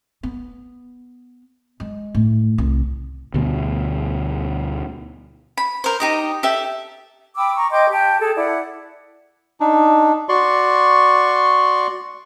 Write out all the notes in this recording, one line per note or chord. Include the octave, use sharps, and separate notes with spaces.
B3
G#3
A2
C2
D2 B2
B5
A#4 C5
D#4 G4 D#5
G4 A4 E5
G5 B5 D6 E6
A#5 C#6
D#5 G5 C6 D6
G4 G5 A5
G#4 A4
E4 D5 F#5
D4 D#4
F#4 D5 C6 C#6